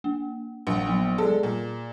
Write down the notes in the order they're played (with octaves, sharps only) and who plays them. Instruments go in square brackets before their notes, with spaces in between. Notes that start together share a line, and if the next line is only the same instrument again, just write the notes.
[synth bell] A#3
[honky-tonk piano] A#1 [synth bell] F5 F#5
[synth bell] F#3 B3
[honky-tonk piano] G#3 A4 [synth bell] G#4 D5
[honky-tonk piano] A#2